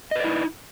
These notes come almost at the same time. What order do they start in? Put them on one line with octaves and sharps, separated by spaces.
D#5 B4 D5 E4 D#4